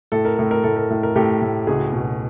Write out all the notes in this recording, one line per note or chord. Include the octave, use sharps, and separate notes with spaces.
A2 A4
A#4
A2 A4
A#4
A2 A4
A#4
A2 A4
A#4
A2 G4 A4
A2
C#2 F#4 G#4
B2